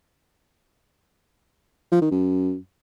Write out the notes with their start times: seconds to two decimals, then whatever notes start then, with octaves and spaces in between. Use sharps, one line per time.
1.92 F3
2.02 D#3
2.11 F#2